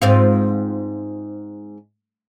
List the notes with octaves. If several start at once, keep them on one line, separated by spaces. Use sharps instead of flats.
G#2 C4 F4